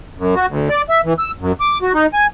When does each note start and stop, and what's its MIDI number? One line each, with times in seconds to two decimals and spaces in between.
0.18 0.35 42
0.36 0.46 66
0.48 0.69 38
0.69 0.82 74
0.89 1.01 76
1.05 1.13 52
1.19 1.31 88
1.40 1.52 42
1.60 1.78 86
1.82 1.93 66
1.94 2.06 63
2.13 2.27 80